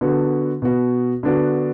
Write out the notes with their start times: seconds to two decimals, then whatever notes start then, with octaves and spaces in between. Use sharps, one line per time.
0.01 D3 B3 F#4
0.62 B2 B3 F#4
1.23 D3 B3 D4 F#4